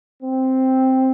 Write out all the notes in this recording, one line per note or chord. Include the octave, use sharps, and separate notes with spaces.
C4